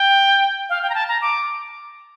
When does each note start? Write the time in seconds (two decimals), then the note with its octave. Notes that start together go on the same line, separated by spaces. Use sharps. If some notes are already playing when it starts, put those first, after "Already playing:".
Already playing: G5
0.69 F5
0.83 G5
0.90 A#5
0.95 A5
1.08 A#5
1.22 D6